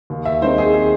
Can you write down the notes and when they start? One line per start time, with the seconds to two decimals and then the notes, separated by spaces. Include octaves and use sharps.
0.10 D#2
0.25 E5
0.42 D#3 G#3 C4 D#4 C5
0.58 G#4
0.74 G#4